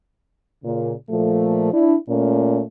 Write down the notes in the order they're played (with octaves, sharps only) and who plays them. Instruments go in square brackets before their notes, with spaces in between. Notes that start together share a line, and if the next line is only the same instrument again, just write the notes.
[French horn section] A#2 C#3
A#2 F3 A3
D4 E4
A#2 A3 C#4